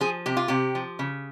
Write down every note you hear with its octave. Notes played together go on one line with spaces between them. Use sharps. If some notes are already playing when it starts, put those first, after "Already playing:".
F3 G#4
C3 G4
F4
C3 G4
F3
C#3